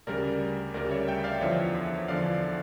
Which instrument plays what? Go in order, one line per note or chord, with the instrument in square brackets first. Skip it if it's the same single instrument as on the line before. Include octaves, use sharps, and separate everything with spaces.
[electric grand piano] D2 C#3 G3 A#4 D5
D2 C#3 G3 A#4 D5
C#5 E5
E5 G5
D5 F5
E2 D3 F3 C#5 E5
E2 D3 F3 D5 F5